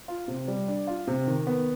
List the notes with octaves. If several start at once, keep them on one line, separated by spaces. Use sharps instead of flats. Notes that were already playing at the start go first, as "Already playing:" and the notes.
F4
C3
G3
D4
F4
C3
D#3
B3